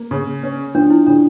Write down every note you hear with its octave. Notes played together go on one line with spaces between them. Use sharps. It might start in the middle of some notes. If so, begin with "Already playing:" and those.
Already playing: A#3
C#3
C#4
F3 D4
E4
C#3 D4